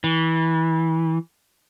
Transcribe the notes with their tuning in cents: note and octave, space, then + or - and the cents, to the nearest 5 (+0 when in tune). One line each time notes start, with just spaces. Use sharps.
E3 -20